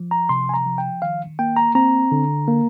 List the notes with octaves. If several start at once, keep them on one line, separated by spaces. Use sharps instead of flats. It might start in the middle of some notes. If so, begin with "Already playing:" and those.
Already playing: F3
A#5
C3 C6
G#5
A#5
F3
G5
D#3 F5
A#3 G5
A#5
C4 A#5
D3
A#3